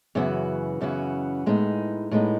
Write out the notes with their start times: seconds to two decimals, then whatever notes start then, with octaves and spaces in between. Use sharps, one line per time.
0.15 F#2 C#3 E3 B3 F#4
0.81 F#2 C#3 E3 B3 F#4
1.46 A2 G#3 B3 D#4
2.11 A2 G#3 B3 D#4